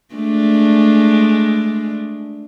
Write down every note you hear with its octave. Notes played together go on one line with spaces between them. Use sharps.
G#3 A3 D4